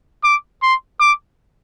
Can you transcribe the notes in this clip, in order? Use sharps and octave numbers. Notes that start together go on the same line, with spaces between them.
D6
C6
D6